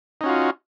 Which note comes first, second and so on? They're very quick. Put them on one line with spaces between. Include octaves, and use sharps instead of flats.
D#4 C#4 F#4 F4